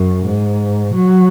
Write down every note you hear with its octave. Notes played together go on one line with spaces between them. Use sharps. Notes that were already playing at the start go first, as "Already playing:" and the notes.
Already playing: F#2
G#2
F#3